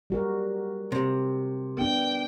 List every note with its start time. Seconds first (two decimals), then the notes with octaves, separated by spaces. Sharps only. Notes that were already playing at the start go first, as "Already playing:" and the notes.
0.10 G3 F#4 A#4
0.92 C3
1.78 B3 D4 G5